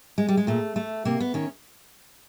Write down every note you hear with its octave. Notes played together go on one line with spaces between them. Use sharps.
G#3
G3
G#3
A#2 A3
A3
C3 A#3
B3
D#3 C#4